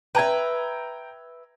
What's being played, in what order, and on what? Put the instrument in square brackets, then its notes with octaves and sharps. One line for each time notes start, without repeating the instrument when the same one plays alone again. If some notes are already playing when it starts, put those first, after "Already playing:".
[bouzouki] B4 E5 [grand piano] G5 A#5 G#6